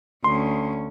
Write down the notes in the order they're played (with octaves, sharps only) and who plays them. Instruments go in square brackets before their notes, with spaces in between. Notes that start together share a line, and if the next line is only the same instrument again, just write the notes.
[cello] D2 C#4 [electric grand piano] C6